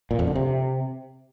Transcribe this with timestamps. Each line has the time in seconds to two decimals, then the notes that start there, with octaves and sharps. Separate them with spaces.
0.11 A#2
0.19 F2
0.27 D3
0.36 C3